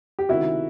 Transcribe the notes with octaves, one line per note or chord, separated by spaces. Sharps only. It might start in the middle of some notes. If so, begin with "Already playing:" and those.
G4
C#2 C3 D#3 E4 F#4